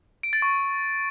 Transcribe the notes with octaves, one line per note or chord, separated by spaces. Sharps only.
D7
A6
C#6